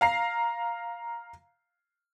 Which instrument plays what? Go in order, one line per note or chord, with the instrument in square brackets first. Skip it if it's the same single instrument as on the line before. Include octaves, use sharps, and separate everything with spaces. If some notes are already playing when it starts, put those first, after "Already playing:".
[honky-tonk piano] F5 A#5 C7